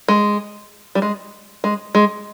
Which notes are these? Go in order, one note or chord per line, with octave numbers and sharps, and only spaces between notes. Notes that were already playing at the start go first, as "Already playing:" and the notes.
G#3
G3
G#3
G#3
G#3